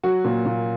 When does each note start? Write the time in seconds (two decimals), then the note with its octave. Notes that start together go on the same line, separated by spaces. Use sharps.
0.04 F#3 F#4
0.24 A#2
0.45 A#2